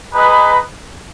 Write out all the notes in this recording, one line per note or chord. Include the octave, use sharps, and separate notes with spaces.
D#4 G#4 B4 D#5